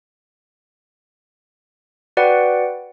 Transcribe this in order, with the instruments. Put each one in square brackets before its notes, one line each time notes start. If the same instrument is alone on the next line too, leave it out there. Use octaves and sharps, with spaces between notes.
[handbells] F#4 B4 D5 F#5 G5